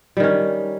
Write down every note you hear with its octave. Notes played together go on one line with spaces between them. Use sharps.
D#3 G3 C#4